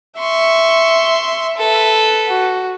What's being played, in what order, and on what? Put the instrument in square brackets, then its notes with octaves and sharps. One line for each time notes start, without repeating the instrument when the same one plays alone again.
[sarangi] E5 [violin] C6 C#6
[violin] A4 B4
[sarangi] F#4